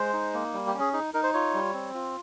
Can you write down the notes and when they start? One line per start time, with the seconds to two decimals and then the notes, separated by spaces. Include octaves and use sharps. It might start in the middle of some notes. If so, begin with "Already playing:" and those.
Already playing: G#3 C5
0.13 D#4
0.34 A#3
0.53 G3
0.67 G4
0.74 C#4
0.80 G#4
0.93 D#4 G#4
1.14 D#4 A#4
1.23 C5
1.34 F4 C#5
1.54 G3
1.74 C4
1.94 F4